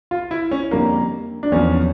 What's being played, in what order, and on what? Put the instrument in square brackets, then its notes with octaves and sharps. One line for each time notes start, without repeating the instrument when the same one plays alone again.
[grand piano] F4
E4
C#4
F2 D3 G3 A#3
D4
E2 D3 F3 C#4